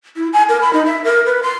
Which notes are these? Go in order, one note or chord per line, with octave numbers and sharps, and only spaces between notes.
E4
G#5
A#4
B5
D#4
E5
A#4
B4
C6